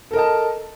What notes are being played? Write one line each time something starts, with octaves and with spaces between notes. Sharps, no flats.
A4 A#4 D#5 A5